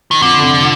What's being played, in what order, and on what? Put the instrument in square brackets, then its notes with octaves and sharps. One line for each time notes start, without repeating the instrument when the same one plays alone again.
[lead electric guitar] D#3
[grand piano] F2 [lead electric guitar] D3
[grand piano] C3 F3